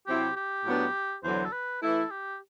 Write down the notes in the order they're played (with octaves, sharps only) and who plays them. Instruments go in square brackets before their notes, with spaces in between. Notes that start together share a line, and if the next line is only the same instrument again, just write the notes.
[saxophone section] C3 F#3 C4 E4 [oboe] G4
[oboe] G4
[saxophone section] A2 F#3 B3 D4
[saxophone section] E2 D3 F#3 [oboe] C5
[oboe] A4
B4
[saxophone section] E3 A3 E4 [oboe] A4
[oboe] G4